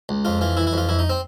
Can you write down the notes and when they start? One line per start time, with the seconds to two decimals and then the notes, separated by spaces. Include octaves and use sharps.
0.09 C#2
0.25 F2 F4
0.41 E3 F4
0.57 E3 E4
0.67 E4
0.73 F2 F4
0.89 F2 E4
0.99 D#4
1.10 C4